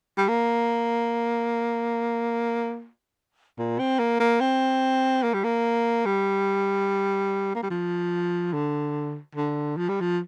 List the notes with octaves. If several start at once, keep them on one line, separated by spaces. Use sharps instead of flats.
G3
A#3
A#2
C4
A#3
A#3
C4
A#3
G3
A#3
G3
A#3
G3
F3
D3
D3
F3
G3
F3